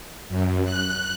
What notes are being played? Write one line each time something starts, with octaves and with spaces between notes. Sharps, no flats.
F#2
F#6